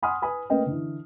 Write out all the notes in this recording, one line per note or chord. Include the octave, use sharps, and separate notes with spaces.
F#5 G#5 B5 C6 D#6 F6
B4 G#5 B5 D#6
A3 A#3 C#4 B4 D#5 G5
D3 E3